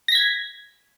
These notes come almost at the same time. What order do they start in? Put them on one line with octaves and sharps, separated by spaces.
A#6 B6 G#6